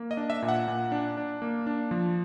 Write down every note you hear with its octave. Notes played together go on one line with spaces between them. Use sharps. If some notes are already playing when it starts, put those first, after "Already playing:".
Already playing: A#3
D#5
D4
E5
A#2
F#5
A#2
D4
D4
A#3
D4
F3